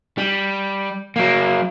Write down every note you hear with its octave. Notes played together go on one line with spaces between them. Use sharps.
G3
F#3 A#3